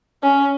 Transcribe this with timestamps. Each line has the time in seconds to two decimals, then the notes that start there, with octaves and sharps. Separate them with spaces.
0.23 C#4